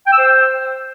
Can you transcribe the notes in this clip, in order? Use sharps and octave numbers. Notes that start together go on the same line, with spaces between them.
G5
E6
C5